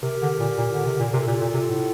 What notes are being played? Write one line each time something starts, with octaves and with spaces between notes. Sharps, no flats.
C3 G4 A#4
D3
A#2
A#2
D3
C3
A#2
C3 A#4
A4
A#2 G4
F4 A4
A#2
C3
A2